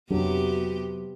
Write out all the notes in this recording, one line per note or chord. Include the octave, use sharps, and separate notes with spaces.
F2 C3 F#3 B3 D4 G4